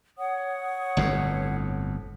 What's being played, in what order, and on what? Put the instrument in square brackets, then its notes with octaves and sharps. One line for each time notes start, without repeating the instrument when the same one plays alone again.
[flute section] C#5 F#5 D#6
[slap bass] G1 F2 A2